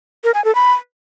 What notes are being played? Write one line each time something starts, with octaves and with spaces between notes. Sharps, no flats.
A#4
G#5
A4
B5